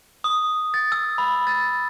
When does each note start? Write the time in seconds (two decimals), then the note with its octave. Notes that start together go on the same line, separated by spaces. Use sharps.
0.24 D#6
0.74 A6
0.92 E6
1.18 B5
1.47 A6